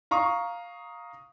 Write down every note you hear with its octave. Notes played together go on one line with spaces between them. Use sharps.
F5 A#5 C#6 D#6